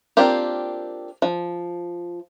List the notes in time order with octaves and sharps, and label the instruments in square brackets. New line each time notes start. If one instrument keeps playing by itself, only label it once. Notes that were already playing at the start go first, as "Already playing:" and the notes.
[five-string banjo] A#3 C4 D4 F4 G4
F3